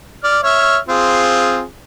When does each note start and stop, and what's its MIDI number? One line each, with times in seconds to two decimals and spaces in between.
0.24 0.38 74
0.24 0.38 89
0.43 0.77 73
0.43 0.77 76
0.43 0.77 89
0.88 1.64 60
0.88 1.64 65
0.88 1.64 68